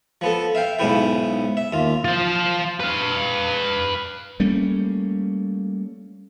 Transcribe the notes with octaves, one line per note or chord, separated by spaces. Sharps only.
F3 B3 A4
E5 F5 G5
B1 G#2 C#3 B3 E4 G5
E5
D#2 F4
F4 C5
B4 F5
G3 A3 A#3 C#4